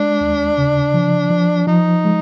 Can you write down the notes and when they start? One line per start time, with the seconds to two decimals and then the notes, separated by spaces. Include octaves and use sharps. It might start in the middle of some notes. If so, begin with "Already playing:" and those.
Already playing: G#3 D4
0.21 D#2
0.58 C#3
0.94 F3
1.30 F3
1.67 F3 D#4
2.04 G#3